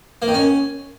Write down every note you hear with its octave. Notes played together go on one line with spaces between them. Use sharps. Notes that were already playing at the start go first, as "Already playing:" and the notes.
A#3
D#3
C#4